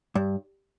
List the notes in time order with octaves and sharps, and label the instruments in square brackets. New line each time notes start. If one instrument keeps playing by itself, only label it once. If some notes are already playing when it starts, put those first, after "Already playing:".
[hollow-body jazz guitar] G2